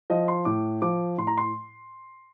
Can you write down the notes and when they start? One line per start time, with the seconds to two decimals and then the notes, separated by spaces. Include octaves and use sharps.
0.10 F3 D#5
0.28 C6
0.45 A2 D6
0.82 F3 D6
1.18 A2 C6
1.27 A#5
1.38 C6